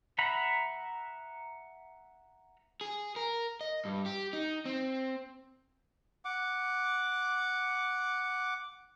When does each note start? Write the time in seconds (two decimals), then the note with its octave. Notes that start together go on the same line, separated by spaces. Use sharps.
0.19 E5 F#5 A#5 B5
2.81 G#4
3.16 A#4
3.61 D#5
3.85 G2
4.06 G4
4.33 D#4
4.65 C4
6.25 F#5 D6